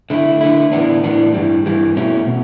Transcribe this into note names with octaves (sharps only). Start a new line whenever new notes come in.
D3 A3 E4
D3 A3 E4
A2 E3 B3 D4
A2 E3 B3 D4
G2 E3 G3
G2 E3 G3
B2 A3 C#4 E4
B2